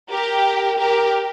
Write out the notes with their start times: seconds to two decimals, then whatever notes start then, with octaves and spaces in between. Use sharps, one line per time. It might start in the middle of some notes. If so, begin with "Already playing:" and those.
0.11 G4 A#4
0.78 G4 A#4